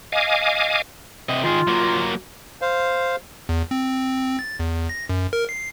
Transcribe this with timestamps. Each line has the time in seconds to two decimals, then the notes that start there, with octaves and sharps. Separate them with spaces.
0.12 D#5 F5 G#5 D6
1.29 C3 D#5
1.44 D#3 F4 G#4
1.68 F#3 A#3
2.61 C5 F5
3.49 E2
3.71 C4
4.39 A6
4.59 E2
4.89 A#6
5.09 F#2
5.33 A#4
5.49 C7